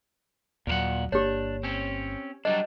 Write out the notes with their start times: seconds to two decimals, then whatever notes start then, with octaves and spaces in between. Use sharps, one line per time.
0.67 D#2 A#2 F#3 A#4 F#5
1.12 G1 A#3 D4 G4 C#5
1.63 C4 C#4
2.45 F#3 G3 D4 D#5